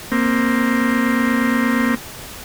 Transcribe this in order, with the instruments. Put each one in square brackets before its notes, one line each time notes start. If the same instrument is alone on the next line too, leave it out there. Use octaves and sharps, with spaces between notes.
[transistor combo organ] A#3 C4